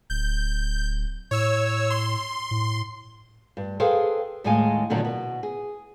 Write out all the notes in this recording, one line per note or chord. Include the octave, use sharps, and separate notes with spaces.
D1 G6
A2 C#5 E6
C6
A2
G2
G#4 A4 B4 C5 F5 G5
D#2 A2 D#3 G#3 F5 G#5
A#2 D3 D#3 F#3 A#3
B2
G#4